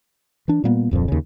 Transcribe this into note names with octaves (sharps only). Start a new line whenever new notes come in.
E3 D4
A#2 G3 A#3 B3
D1 F2 A#2 F3
D#2 C#3